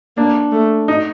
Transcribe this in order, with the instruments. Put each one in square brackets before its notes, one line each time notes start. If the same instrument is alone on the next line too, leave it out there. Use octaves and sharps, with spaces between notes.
[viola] A#3 [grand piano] D4
[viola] A3
[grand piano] D#4